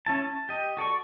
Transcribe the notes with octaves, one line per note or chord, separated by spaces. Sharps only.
C#4 E4 A5
A5
G4 D#5
F#4 A4 D5 C#6